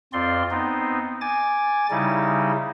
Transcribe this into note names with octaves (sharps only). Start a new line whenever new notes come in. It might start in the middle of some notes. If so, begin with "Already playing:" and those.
F2 C4 F4 D5 C6
B3 C4 D#4
G#5 D6 A6
C#3 G3 D#4 E4